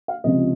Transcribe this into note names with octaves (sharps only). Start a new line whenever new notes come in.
F5
C#2 C3 F3 C4 D#5